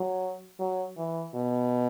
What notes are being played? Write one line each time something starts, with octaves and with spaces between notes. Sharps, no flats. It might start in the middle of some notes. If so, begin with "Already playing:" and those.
Already playing: F#3
F#3
E3
B2